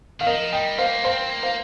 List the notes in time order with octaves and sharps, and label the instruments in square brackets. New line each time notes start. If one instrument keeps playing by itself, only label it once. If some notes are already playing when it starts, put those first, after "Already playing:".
[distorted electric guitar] D#3 [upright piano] F5
[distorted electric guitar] F3 [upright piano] A#4 D#5
[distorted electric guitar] G3 [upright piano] D#5 G5
[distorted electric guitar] A#3 [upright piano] C5 F5
[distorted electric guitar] C4 [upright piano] C5 F5
[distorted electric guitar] A#3
[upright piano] C5 F5